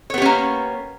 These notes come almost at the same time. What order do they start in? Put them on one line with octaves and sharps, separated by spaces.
C#5 B3 G4 C#4 A#3